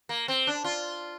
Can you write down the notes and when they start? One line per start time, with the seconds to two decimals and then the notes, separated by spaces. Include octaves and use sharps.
0.09 A#3
0.28 C4
0.47 D4
0.64 F4